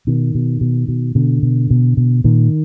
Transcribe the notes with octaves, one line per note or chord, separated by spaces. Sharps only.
B2 D#3
B2
B2
B2
B2 D3
B2
B2
B2
A#2 D#3